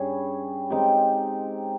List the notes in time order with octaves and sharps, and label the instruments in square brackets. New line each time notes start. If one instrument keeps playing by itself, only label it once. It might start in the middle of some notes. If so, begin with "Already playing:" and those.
Already playing: [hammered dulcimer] G2 G3 C#4 G#4
G#3 C4 D#4 G4